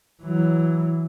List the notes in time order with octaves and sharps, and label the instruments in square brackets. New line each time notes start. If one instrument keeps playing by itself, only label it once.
[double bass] E3 F#3